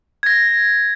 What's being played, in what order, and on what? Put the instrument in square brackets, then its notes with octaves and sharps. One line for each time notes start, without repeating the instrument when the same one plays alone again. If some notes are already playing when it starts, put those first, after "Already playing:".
[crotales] G#6 A#6